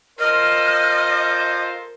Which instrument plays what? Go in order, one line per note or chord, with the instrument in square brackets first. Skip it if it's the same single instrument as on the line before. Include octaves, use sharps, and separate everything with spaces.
[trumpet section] F4 A4 C5 [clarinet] A#4 [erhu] D#5 [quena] F6